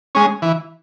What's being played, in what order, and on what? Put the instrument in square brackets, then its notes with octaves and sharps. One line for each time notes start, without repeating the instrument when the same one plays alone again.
[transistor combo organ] G#3 C#4
E3